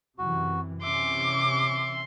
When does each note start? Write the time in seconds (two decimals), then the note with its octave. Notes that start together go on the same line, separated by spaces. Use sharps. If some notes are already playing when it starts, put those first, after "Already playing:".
0.18 F#2 C3 E3 F#4
0.83 C3 E3 C#4 E5 C6 D6